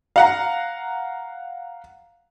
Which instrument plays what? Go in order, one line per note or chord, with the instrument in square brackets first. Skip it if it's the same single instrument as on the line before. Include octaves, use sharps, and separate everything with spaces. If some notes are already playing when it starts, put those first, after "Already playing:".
[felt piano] F5 F#5 A#5